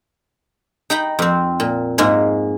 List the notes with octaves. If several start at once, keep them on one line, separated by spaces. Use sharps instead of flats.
D#4 G5 A#5 B5
F2 C4
A#2
G#2 G#3 A#3